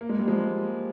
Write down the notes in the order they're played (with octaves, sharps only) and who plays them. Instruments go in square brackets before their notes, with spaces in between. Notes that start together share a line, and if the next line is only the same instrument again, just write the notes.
[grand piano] A#3
G#3
G3
F3 G#3